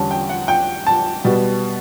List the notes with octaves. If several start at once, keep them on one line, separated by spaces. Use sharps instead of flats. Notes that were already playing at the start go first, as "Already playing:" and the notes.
Already playing: E2 D3 G3 C#4 A5
G5
F#5
G5
A5
B2 G3 B3